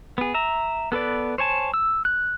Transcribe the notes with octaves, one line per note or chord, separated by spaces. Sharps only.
B3 G#4
E5 A#5
B3 A4 B4 D5
C5 C#5 G#5 A5
E6
F#6